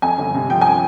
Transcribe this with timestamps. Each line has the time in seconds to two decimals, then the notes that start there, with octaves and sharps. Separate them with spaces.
0.02 F2 G#5
0.18 G1
0.34 C3
0.50 F3 G5
0.61 G#5